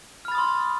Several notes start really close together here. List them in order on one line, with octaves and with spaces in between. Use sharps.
F6 B5 A6 D#6 C6